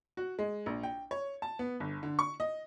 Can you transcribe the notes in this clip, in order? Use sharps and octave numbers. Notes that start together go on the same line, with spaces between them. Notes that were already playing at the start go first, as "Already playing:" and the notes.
F#4
G#3
A#1
G5
C#5
A5
B3
G1
D3
C#6
D#5